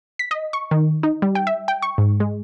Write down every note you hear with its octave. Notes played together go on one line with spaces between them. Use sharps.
B6
D#5
C#6
D#3
D#4
G3
G5
E5
G5
C#6
G#2
G#3